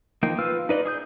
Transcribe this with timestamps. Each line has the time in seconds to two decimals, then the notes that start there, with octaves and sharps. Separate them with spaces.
0.23 F3 A#3 D#4 G5
0.39 F4 B4 F5 E6 F6
0.69 D#4 B4 D5 D#5
0.85 G#4 D#6 G6